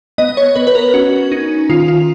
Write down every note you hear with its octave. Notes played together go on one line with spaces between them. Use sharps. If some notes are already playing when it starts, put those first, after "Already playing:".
B3 D#5
C#5
B3 B4
B4
A#4
C#4 F#4
C#4 D#4
D#3 F4
F4